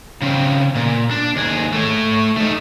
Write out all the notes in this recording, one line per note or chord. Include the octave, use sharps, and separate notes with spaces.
C#3 C4
A#2
D4
D#2 G#4
A3 C#5
A3 D#4